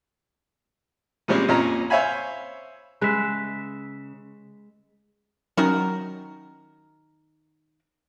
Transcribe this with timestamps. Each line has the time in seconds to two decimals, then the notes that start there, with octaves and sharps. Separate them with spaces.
1.28 A#2 G3 G#3 C4 C#4
1.48 F2 A#2 C#4 C#5 A#5
1.90 C5 C#5 E5 F5 G#5 B5
3.01 C#3 G#3 B4 E5
5.57 D#3 F#3 C#4 D#4 F#4 A#4